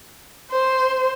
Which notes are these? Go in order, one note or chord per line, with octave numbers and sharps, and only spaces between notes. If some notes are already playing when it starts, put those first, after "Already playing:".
C5